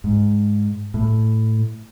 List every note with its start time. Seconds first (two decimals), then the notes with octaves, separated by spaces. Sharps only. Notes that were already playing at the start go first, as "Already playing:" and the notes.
0.04 G#2
0.94 A2